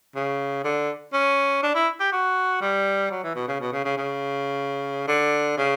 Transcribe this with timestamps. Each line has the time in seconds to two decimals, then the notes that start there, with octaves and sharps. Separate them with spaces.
0.15 C#3
0.64 D3
1.13 C#4
1.63 D4
1.75 E4
2.00 G4
2.12 F#4
2.61 G3
3.11 F#3
3.24 E3
3.35 B2
3.48 C#3
3.60 B2
3.72 C#3
3.85 C#3
3.97 C#3
5.08 D3
5.57 C#3